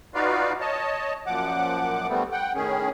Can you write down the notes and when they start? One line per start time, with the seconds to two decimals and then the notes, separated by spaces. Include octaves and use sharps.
0.15 D#4 F4 F#4 B4 D5 F5
0.60 C#5 D#5 A5
1.26 F#2 A#2 F3 F#5 D6
2.09 D3 G3 A3 B3 C4
2.32 F#5 G5
2.55 A2 D#3 C#4 G#4